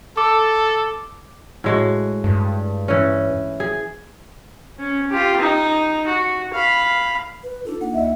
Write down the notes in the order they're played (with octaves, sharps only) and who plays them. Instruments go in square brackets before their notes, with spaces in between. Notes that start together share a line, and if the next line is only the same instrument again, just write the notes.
[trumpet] A4 [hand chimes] D6
[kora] A2 G#3 F#4
[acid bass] G2
[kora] E3 C#4
G#4
[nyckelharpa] C#4
F4 G4
D#4
F#4
F5 B5
[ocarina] B4
[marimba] D4 D#4 F4 [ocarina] A4
[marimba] A#3 D#4 [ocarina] F#5
[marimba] D2 A#3 D#5 [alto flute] E5